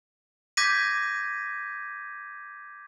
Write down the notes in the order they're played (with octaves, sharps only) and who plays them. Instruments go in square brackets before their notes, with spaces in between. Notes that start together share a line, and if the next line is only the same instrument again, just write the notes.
[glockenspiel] D6 G6 G#6 A#6 B6 D#7